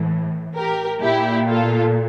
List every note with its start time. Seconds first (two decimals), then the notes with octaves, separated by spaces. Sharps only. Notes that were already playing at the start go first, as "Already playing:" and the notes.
Already playing: A2 E3
0.56 G4 A#4
1.01 A#2 E4 G4
1.47 F4 A4